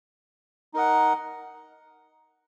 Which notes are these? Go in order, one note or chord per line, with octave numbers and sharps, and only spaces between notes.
D#4 A#4 D#5 F#5